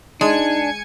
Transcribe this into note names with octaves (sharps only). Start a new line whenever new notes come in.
G#3 D4 D#4 G#5 G#6 C#7